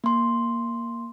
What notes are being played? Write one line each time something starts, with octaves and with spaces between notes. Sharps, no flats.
A#3 C6